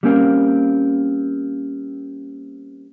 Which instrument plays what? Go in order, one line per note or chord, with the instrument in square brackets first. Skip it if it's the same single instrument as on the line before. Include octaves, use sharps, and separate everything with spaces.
[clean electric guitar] G3 A#3 C4 C#4 A#4 F5